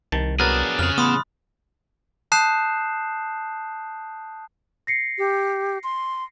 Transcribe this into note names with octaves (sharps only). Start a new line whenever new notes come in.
C2 D#3 A5
F#3 B3 D4 G#4 A#4 F#6 A6
F2 C#3 G#4 F6
A1 B3 B5 C6 D#6
A5 D#6 F#6 G6 C7 E7
A#6 C7 C#7
G4
C6